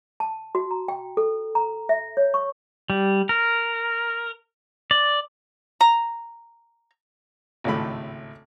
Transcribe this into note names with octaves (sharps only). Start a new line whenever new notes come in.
A5
F#4
A#5
G5
A4
A#5
E5
C#5
C#6
G3
A#4
D5
A#5
G#1 C#2 A2 A3 B5